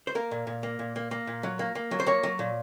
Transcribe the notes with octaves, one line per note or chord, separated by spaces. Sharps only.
C5
A#3 A#4
A#2
A#2
A#3
A#2
A#3
A#3
A#2
F#3
A#3
A#3
F#3
C5
A#3 C#5
F#3
A#2